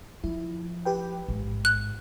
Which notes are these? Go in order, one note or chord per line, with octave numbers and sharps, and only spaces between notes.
F3 E4
G4 B4 G5
A1 G#2
F#6